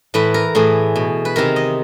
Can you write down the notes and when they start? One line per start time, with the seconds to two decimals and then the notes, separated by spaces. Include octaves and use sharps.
0.14 A2 E3 B4
0.34 A#4
0.55 A2 E3 G#4
0.96 B2
1.25 B4
1.36 C3 D#3 A#4
1.56 D#5